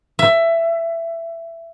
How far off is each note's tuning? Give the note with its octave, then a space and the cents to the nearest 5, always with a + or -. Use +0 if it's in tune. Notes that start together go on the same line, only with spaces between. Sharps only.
E5 +15